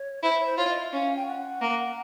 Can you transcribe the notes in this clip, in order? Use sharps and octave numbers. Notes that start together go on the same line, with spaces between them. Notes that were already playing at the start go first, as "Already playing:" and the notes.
Already playing: C#5
E4 C5
C5
C#5
C5
F4 C#5
D#5
E5
C#4 F5
G5
F#5
A#3